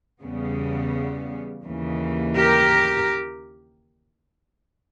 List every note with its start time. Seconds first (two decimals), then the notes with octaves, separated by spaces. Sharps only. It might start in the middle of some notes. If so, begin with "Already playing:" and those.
0.22 E2 C#3 G3 B3
1.65 D#2 C#3 E3
2.36 G4 A#4